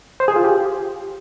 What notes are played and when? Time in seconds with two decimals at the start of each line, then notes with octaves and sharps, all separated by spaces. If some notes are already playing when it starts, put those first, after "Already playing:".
0.20 C5
0.28 G#4
0.36 F4
0.44 G4